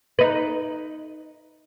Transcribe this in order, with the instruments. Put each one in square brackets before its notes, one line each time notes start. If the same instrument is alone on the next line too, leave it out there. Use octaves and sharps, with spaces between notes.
[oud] D#4 B4